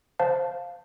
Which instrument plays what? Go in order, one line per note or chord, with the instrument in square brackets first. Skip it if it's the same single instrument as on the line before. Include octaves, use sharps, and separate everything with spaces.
[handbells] C5 F5 A5